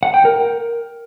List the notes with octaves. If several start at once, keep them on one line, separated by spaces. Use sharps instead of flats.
F#5
G5
A#4